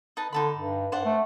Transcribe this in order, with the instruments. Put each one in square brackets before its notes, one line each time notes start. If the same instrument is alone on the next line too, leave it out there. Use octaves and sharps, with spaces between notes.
[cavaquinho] D#4 B4 A5
[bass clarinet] D3 [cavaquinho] D#4 A5 B5
[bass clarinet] G2
[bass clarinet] G2 [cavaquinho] C5 D5 F#5
[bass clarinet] A3